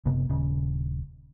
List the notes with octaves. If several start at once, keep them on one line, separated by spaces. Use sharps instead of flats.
F#1 C3 B3
D#1 C#3